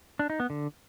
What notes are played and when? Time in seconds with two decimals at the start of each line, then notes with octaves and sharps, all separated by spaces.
0.19 D4
0.30 D#4
0.40 B3
0.50 D3